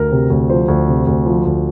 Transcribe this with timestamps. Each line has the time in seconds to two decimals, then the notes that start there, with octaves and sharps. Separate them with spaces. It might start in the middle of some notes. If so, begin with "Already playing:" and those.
Already playing: D2 A#4
0.12 C3
0.30 D2
0.50 F3 C5
0.68 D2
0.88 C3
1.07 D2
1.26 F3
1.45 D2